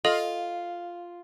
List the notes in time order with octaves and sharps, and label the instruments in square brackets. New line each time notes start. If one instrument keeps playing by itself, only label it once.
[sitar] F4 [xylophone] A4 D#5 F#7